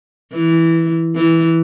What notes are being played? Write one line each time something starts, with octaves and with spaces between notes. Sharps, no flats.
E3
E3